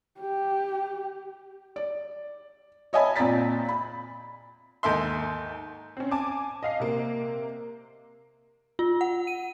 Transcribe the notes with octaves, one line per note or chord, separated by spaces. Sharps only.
G4
D5
C#5 D#5 E5 G#5 A5 B5
A#2 C4 D5 A#5 A6 B6
B5
D#2 G#2 A4 E5 C6
C4 C#4
G#5 A5 D6
D#5 F5 C7
C3 A#3
F4
F#5
D#7